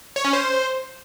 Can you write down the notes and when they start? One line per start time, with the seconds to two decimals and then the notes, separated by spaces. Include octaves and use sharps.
0.16 C#5
0.25 C#4
0.33 C5